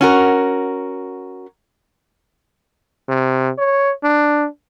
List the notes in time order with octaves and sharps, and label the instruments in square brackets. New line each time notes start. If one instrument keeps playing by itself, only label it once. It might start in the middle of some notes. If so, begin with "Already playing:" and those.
[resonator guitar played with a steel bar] C#4 F#4 A#4
[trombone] C3
C#5
D4